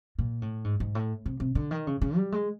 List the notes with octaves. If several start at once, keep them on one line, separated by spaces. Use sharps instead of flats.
A#2
A2
G#2
G#2
A2
C3
C3
D3
D#3
C#3
C#3
G3
G#3